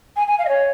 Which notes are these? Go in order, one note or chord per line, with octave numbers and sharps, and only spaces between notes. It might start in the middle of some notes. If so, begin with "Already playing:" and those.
G#5
G#5
F5
D#5
C#5